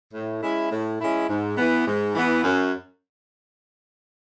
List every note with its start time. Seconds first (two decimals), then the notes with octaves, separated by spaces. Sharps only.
0.13 A2
0.42 G#3 C#4 E4
0.71 A2
1.00 G#3 C#4 E4
1.29 G#2
1.57 E3 B3
1.87 G#2
2.15 E3 B3
2.44 F#2